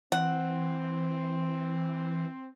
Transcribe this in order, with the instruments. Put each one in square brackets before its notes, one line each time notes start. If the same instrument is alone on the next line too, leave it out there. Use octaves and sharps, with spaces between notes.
[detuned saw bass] E3 [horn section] C4 [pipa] F#5